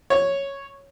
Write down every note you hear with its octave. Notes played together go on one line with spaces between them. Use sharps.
C#5